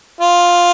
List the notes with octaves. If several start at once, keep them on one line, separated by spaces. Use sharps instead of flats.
F4